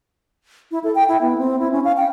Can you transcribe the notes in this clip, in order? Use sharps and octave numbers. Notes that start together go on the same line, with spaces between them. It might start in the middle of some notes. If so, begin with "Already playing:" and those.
E4
A4
G5
E4
B3
C4
E4
C#4
F5
G5